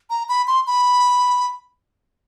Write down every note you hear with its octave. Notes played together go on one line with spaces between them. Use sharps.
A#5
B5
C6
B5